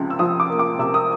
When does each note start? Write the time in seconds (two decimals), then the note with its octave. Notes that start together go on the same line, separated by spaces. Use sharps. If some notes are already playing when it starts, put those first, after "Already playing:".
Already playing: C#2 C3 F3
0.10 E6
0.19 F3 D#6
0.40 D6
0.50 A#3
0.59 D6
0.79 C3 E6
0.94 D#6